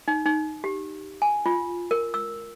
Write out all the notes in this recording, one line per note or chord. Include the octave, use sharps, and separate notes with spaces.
D#4
D#4
G4
G#5
F4
A#4
E6